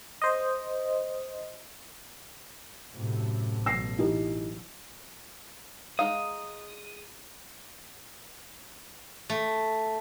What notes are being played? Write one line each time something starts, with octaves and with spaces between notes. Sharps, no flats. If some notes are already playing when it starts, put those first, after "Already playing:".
C5 D#5
F#2 A2 C3
A1 B2 F#3 E6 A#6 C7
E3 D#4 G4
G#3 D#4 F5 D#6
A3